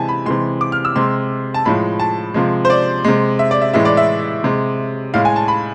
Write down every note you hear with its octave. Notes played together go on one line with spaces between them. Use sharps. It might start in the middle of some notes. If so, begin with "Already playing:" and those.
Already playing: C3 E3 G#3 G#5 A5
B5
C3 E3 G#3 C6
D6
F6
E6
C3 G#3 C6
A5
A2 F3 G#3 B5
A5
C3 F3 G#3
C5
D5
C3 G#3
E5
D5
E5
A2 E3 G#3 E5
D5
E5
C3 G#3
A2 G#3 F5
G#5
A5
B5